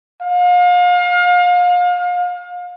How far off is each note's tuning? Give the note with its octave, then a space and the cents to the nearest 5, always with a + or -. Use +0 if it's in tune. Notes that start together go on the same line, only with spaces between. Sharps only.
F5 +35